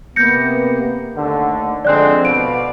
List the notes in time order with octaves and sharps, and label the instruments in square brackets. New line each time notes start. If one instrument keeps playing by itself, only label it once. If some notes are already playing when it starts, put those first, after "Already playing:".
[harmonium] C3 A#3 B3 [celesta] G6 A#6 C#7
[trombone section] D#2 D3 [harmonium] A3
[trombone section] D3 G#3 C4 [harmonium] F3 [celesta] D5 F#6
[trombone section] B2 [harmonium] D5 F5 [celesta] D7